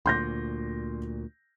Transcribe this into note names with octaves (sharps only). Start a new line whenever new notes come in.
D2 A#2 C6 G6 A#6